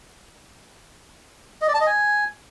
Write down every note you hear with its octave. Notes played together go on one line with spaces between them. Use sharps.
D#5
D5
A5
D#5
G#5